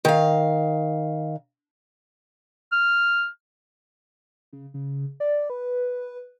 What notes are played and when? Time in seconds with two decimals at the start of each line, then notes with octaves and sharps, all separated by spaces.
0.05 D#3 F5
2.72 F6
4.53 C#3
4.74 C#3
5.20 D5
5.50 B4